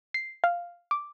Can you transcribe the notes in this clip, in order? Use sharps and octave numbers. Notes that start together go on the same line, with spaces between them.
C7
F5
D6